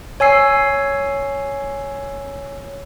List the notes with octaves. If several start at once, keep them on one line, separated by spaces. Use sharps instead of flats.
C#5 G#5 E6 C7